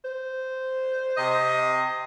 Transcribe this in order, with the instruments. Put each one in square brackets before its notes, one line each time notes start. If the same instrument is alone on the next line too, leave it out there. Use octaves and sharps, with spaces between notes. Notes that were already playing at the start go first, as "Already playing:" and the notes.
[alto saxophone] C5
[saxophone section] C3 D#5